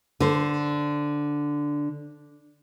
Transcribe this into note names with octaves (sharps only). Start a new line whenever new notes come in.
D3 C5